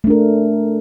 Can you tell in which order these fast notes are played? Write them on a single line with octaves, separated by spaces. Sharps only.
A3 D4 A#4